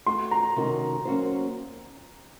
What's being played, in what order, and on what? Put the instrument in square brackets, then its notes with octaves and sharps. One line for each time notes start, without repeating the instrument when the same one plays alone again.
[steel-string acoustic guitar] A3 C4 F#4 [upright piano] C6
[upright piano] A#5
[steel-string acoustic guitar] C3 D#3 A3 C#4 F#4
F#3 A#3 C#4 F#4 C5